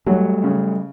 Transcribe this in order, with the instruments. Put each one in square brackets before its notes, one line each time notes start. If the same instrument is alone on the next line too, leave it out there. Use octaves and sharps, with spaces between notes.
[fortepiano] F#3 [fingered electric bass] G3 A3
[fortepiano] C#3